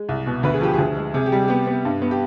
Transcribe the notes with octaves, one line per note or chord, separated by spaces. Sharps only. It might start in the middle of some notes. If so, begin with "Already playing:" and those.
Already playing: G#3
C2
B2
D2 B4
G#4
F3 G4
D2 G#4
G#3
C3 G#4
G4
G3
B3 G4
B3
G2
B3
G4